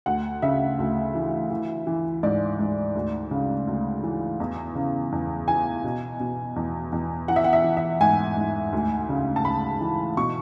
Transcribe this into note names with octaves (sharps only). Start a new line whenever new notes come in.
D2 F#5
C#3 E5
D2
E3
E3
E3
G#2 D5
G#2
D2
C#3
D2
E3
E2
C#3
E2
E3 G#5
B2
B2
E2
E2
E3 F#5
E5
F#5
E5
E3
E5
G#2 G#5
G#2
D2
C#3
A5
D2 B5
E3
B2 C#6